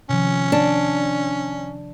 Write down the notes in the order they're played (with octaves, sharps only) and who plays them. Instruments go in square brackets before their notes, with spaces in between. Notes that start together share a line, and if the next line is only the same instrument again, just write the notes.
[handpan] C3 D#3 F3 [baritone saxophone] C#4
[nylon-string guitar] D4